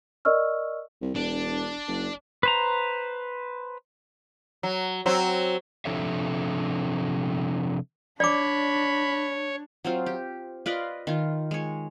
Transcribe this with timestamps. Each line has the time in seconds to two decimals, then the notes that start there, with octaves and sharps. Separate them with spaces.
0.25 A#4 D5 D#5 C#6 E6 F6
1.01 C2
1.15 E1 D4
1.88 F#1
2.43 B4 C5 A#5
4.63 F#3
5.06 F#3 C4
5.85 C3 F3 D4 A4 C#5 E5
8.20 D4 C#5 D5 B5 D6
9.84 F#3 C4 F4
10.06 G4
10.66 F4 B4 D5 D#5
11.07 D#3 F4
11.51 G#3 C#5